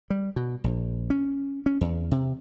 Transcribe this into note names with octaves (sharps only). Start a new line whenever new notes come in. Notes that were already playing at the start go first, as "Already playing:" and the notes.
G3
B2
A#1
C#4
C#4
E2
C3